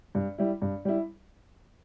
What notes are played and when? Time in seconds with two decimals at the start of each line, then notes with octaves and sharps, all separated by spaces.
0.15 G2
0.38 G3 E4
0.62 G2
0.85 G3 E4